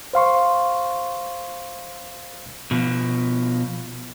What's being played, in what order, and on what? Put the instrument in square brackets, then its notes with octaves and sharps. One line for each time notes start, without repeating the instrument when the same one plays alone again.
[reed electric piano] C5 F5 C6 C#6
[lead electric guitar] B2 F3